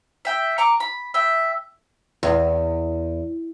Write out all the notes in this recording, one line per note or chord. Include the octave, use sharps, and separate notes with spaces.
E5 G5
A#5 C#6 D6
B5
E5 G5
E2